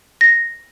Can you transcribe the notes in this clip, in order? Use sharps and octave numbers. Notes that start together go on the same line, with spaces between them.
A#6